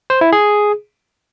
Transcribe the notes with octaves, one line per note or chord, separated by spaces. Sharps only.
C5
E4
G#4